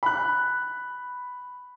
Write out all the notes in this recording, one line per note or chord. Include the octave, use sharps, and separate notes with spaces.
B5 F#6